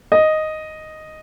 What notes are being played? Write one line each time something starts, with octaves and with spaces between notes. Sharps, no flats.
D#5